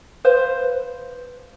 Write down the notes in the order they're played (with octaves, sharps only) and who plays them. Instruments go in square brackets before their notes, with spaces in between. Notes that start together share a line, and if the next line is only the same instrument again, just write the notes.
[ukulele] B4 C5 F5